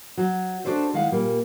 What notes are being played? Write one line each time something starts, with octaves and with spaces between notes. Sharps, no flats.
F#3
D4 F#4 A4 C5 E5
D#3 G#3 E4 F5 F#5
A#2 G3 A#3